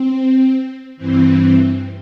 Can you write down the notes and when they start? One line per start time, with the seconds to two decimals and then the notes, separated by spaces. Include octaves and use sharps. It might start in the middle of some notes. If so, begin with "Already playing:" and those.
Already playing: C4
0.97 G2 E3 C4